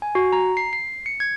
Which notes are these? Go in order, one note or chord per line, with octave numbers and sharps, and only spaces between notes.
G#5
F#4
A#5
C7
C7
C#7
G#6